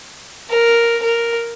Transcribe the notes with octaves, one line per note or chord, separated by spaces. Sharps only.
A#4
A#4